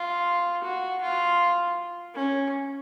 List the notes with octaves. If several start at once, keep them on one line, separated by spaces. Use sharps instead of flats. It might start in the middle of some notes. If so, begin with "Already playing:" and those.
Already playing: F4
F#4
F4
C#4